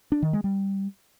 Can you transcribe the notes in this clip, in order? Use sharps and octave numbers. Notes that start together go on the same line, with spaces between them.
D4
D#3
G#3
G3